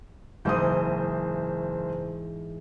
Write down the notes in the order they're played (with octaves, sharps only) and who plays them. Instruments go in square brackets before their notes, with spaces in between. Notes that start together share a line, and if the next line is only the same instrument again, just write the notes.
[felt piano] F#1 C5 D#6 [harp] G#2 E3 G6